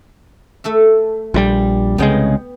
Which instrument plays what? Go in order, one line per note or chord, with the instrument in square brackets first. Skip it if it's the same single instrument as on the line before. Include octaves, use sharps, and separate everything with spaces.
[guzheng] A3 A4 E5
[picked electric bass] A#1 E3 G3
[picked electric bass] C2 C#3 G#3 [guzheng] B3 G5